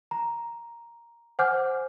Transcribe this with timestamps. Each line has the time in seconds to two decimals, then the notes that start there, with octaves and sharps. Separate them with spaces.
0.11 A#5
1.39 C5 F#5 G#5 D6 F6 G6